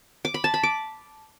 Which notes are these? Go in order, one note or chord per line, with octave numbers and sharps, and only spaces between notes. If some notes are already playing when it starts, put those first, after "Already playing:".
D6
B5
A5
B5
D6